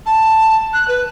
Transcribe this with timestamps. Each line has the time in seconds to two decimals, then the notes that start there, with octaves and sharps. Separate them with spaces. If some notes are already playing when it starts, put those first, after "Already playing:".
0.06 A5
0.73 F#6
0.88 B4